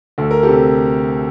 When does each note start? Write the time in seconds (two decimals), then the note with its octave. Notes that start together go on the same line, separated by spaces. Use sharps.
0.18 D2 A4
0.31 A#4
0.43 G4 A4
0.48 C3